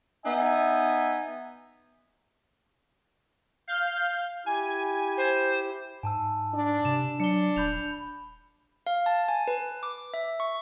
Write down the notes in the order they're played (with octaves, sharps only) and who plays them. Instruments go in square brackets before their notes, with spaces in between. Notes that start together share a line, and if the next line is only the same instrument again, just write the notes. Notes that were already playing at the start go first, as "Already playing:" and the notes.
[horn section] B3 D#4 E5 G5 G#5
[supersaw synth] F5 G6
[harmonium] E4 G4 [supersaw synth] G#5
[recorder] C5
[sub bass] G#2 [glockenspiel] G#5 A5 E6
[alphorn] D4
[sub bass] C3 [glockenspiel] E7
[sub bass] F#3 [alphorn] D4 [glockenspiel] C#7 G7
[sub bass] D#1 [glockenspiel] B5 G6 F7
[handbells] F5
A5
G#5
B4
D6
E5
C#6